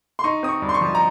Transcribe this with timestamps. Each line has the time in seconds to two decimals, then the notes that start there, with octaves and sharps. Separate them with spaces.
0.19 C6
0.24 D#4 C#6
0.43 C4 D#6
0.49 C#6
0.62 G2
0.69 C6
0.74 C#6
0.81 F3
0.95 A#5